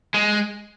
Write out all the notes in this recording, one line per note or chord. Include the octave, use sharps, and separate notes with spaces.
G#3